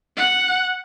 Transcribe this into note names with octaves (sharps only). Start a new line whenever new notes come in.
F#5